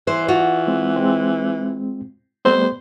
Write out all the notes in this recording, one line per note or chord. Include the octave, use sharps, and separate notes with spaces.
E3 C5
F4 F#4
G#3 C4
G#3 C4
G3 A3 B3 C5